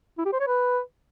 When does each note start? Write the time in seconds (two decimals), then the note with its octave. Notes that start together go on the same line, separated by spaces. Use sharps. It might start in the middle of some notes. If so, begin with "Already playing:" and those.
0.18 E4
0.25 G4
0.33 C5
0.40 C#5
0.47 B4